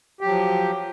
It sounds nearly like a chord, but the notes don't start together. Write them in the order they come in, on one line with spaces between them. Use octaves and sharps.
G4 F#3 F3